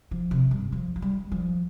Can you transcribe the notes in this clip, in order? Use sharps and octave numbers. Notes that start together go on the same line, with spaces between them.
F3
C3
G2
F3
F3
G3
F3